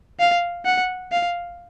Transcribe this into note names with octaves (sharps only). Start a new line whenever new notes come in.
F5
F#5
F5